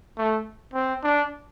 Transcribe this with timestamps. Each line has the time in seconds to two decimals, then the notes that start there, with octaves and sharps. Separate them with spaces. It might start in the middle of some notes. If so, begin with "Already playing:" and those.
0.18 A3
0.74 C4
1.03 D4